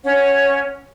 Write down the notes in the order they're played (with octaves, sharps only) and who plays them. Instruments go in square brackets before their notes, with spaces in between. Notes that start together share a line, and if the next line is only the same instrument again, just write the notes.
[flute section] C#4 C#5 F#5